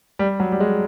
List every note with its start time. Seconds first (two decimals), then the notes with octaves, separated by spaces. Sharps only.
0.19 G3
0.40 F#3
0.52 G3
0.60 G#3